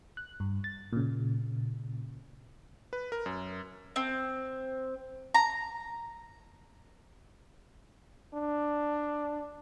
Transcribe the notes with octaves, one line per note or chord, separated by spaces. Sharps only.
F#6
G2
A6
A#2 C#3
B4
A#4
F#2
C4
A#5
D4